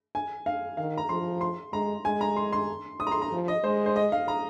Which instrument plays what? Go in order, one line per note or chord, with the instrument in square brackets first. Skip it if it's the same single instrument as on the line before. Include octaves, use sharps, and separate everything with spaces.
[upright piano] G#5
F5
[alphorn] D#3 [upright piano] F5
[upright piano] A#5
[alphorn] F3 [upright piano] C6
[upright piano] C6
[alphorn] G#3 [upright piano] A#5
[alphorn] G#3 [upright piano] G#5
[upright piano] A#5
C6
C6
D#6
A#5
C6
A#5
[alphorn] F3
[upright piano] D#5
[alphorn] G#3 [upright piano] C5
[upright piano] C5
D#5
F5
A#5